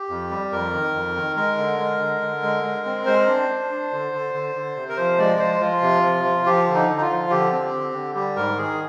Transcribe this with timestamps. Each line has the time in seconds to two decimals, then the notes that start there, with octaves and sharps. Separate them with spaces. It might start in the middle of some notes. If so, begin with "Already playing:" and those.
Already playing: G4
0.10 F2
0.31 G3
0.52 F2 A#4
0.73 D#3
0.94 F2
1.16 D#3
1.36 G#3 A#4
1.58 D3
1.79 G#3
2.00 D3
2.21 D3
2.43 G#3
2.63 G#3
2.86 C4
3.06 G#3 C5
3.27 D4
3.49 D4
3.70 D4
3.92 D3
4.12 D3
4.34 D3
4.55 D3
4.76 C3
4.89 A#4
4.97 F3 C5
5.18 G#3 D5
5.39 F3 C5
5.60 F3 F4
5.82 C3
6.03 F3
6.24 F3
6.46 F3 G4
6.67 D3
6.74 D#4
6.88 D3
6.97 D#4
7.02 F4
7.09 F3
7.30 D3 G4
7.52 C4
7.73 D3
7.94 D3
8.15 G3 G4
8.36 G#2 A#4
8.57 D#3 G#4